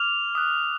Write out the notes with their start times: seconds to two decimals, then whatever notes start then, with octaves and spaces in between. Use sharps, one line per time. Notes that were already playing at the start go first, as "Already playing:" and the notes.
Already playing: D6 F6 F7
0.35 D#6 F#6